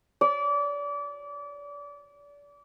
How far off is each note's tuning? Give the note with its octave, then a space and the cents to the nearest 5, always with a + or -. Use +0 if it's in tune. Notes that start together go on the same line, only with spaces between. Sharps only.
D5 -30